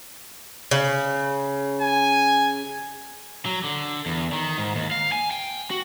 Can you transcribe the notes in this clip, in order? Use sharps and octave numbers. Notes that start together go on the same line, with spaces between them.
C#3
G#5
F#3
D3
E2
D#3
G#2
D#2
F5
G#5
G5
F#4